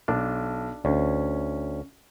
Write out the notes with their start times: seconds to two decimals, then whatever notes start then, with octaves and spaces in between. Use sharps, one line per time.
0.08 B1 D4
0.85 D2 C#4